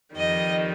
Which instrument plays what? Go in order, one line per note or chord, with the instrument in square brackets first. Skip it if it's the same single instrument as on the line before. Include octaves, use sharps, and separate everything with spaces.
[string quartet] F2 D#3 G3 D#5